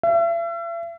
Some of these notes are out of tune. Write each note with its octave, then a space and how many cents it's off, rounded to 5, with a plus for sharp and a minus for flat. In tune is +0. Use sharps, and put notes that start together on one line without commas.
E5 +40